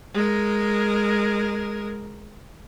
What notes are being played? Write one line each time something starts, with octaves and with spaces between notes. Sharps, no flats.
G#3 A#4